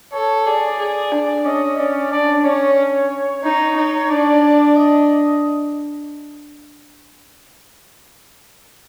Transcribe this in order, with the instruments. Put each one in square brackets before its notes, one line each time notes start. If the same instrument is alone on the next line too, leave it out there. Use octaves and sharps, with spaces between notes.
[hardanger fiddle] A4 [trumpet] C#5
[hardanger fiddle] G#4 [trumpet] D5
[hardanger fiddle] G#4
D4
[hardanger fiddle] C#4 [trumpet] D#5
[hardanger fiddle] C#4 [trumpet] D5
[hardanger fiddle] D4 [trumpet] D5
[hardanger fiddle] C#4 [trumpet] C#5
[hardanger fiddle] D#4 [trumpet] C#5
[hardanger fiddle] D#4
[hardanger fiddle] D4 [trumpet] D5
[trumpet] D#5